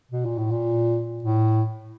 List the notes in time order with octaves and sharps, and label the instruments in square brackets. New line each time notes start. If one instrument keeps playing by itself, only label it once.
[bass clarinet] B2
A#2
A2
A#2
A2